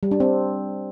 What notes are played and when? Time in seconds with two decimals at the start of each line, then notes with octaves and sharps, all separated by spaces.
0.03 G3
0.11 D4
0.20 C4